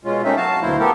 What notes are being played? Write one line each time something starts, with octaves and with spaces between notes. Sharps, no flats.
B2 G#3 C#4 F4
A3 A#3 C4 C#4 D#4 E5
F#3 F#4 F5 A5
D2 B2 A#3 E4 C5
A3 B3 G4 A4 A#4